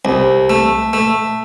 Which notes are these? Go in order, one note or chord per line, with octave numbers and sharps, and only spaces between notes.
C2
A3
A3